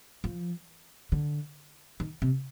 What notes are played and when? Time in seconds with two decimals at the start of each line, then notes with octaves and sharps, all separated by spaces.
0.24 F3
1.12 D3
2.00 D#3
2.22 C3